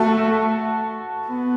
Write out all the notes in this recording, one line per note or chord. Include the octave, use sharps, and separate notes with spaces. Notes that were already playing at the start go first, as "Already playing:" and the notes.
Already playing: A3 F#4 A4
B3